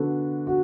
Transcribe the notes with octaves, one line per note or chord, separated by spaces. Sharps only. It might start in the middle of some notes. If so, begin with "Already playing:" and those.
Already playing: D3 B3 D4 F#4 A4
F#4